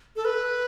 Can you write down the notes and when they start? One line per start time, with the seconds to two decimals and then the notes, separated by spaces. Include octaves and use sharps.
0.16 A4
0.25 B4